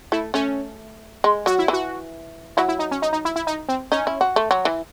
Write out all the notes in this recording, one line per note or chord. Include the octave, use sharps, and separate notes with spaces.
A3 E4
A3 C#4
G#3
F#3 F#4
E4
E3 F#4
F#3 E4
E4
D#4
C#4
D#4
D#4
E4
E4
D#4
C4
C#4 D#4
E4
F#4
A3
F#3
E3